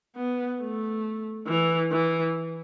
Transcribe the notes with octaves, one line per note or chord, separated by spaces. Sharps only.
B3
A3
E3
E3